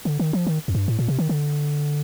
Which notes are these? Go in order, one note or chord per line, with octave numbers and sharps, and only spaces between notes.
D3
D#3
F3
D#3
F2
G2
A2
A#2
C3
D#3
D3